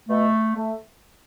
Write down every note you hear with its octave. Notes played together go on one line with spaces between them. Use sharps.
B2 A3
A3